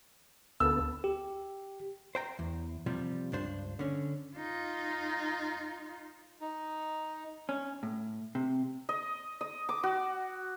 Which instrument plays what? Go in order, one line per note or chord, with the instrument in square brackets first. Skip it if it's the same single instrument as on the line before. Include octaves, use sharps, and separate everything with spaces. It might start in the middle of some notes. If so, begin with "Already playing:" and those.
[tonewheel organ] D2 B3 A4 [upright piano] E6
[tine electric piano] G4
[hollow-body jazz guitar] C5 G5 A#5
E2
C3 F3 G3
C#2 G2 D4 C5
D3 C#4
[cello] D#4 F4
[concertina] D#4
[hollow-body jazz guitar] C#4
A2
C3
[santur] D#5
D#5
D6
F#4